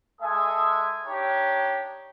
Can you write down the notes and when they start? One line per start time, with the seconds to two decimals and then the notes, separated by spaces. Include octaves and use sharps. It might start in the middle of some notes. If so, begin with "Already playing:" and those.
0.22 G#3 G#4 A4 E5 G#5 D#6
1.05 D4 D#4 G4 C#5